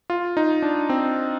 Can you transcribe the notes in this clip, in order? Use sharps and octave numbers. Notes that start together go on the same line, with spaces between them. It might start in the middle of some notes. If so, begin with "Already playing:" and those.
F4
D#4
D4
C4